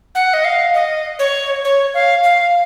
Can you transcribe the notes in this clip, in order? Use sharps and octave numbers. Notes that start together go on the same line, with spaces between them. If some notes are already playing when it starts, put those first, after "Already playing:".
F#5
D#5
F5
D#5
C#5
C#5
F5
F5